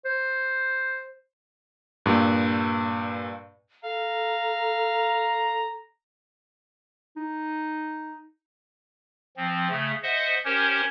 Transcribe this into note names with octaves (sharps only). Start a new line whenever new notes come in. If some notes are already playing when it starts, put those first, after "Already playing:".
C5
G2 A#2
A4 F5 A#5
D#4
F3 C4
C#3 A3
C5 D#5 E5 F#5
C#4 G4 A#4 C5 C#5